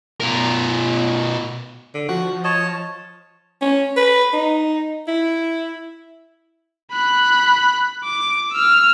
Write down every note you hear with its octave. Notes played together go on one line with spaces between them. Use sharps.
B2 A#4
D3
F3 F#4
C#5 D#5 A5
C#4
B4
D#4
E4
B5 F#6
D6
E6 F6